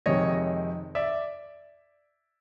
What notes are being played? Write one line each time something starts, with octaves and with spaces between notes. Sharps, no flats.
F2 C3 D#3 G#3 C#5 D#5
D5 E5